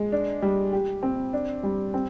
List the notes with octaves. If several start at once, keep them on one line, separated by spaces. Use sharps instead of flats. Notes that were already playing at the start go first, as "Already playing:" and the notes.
Already playing: G#3
D4
G3
G4
C4
D4
G3
C4